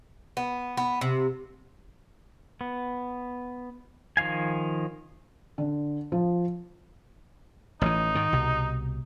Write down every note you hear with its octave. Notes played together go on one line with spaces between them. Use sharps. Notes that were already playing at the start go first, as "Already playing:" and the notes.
B3
B3
C3
B3
D#3 F3 F5 G#5
D3
F3
A1 E3 D#4
G#2 D#3
C2 B2